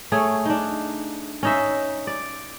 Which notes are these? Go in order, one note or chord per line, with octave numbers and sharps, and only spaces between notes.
A3 G#4 C#5
D4 D#4
C#4 D#4 E5
D5